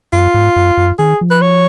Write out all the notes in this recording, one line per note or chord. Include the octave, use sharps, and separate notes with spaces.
F#2 F4
G#2
F#2
F#2
D#3 G#4
F3
B4
C#5